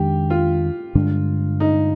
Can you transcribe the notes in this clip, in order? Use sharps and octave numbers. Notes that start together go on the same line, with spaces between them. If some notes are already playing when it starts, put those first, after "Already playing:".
Already playing: F2 D#3 G#3 D4 G4
F4
G2 D3 G#3 D4
D#4